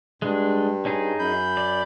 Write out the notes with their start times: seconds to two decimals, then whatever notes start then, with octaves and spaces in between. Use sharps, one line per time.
0.22 G2 G#3 D4
0.85 C#4 D#4 G#4
1.19 F#2 B5 G6
1.57 D5